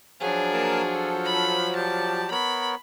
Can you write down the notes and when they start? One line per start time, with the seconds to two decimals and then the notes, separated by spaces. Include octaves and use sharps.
0.21 F3 F#3 D4 G#4
0.53 A#3 A#4 A5
0.94 A4
1.25 B5
1.76 G4 D5 A5
2.31 B3 A#4 C#5 B5